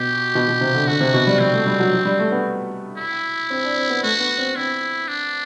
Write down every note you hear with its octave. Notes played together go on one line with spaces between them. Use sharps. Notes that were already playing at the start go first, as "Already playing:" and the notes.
Already playing: B2 G4
B2
B2
C3
D3
D3 F#4
C3
B2
G3
G3 C4
A3
G3
F#3
F#3
G3
A3
B3
E4
C4
D4
C4
B3
A3 F#4
B3
C4
C4 E4
D4